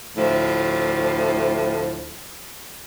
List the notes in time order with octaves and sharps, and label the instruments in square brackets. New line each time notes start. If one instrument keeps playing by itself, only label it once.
[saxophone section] D2 A2 F3